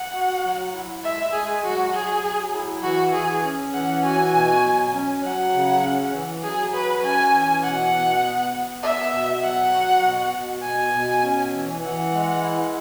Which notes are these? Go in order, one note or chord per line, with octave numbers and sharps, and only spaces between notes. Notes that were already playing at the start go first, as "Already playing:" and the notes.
Already playing: F#5
F#4
F#3
E4
G#3 E5
G#3 G#4
F#3 F#4
F#3 G#4
F#3
E4
E3 F#4
E3 G#4
C#4
E3 F#5
F#4 G#5
B2
F#3
C#4
F#3 F#5
C#3
C#4
E3
F#3 G#4
F#4 B4
C#4 G#5
E3
B2 F#5
B2
B3
B3
B3 E5
B2
F#3 F#5
F#4
B2
B2
B2 G#5
B2
C#4
E3
E3 F#5
G#3
E4